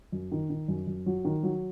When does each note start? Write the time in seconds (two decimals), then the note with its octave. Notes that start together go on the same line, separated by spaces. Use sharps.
0.12 F#2
0.32 D#3
0.50 D#3
0.68 F#2
0.87 F#2
1.06 F#3
1.25 D#3
1.43 F#3